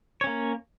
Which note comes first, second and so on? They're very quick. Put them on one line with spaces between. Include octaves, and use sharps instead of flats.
C#5 C#4 A#3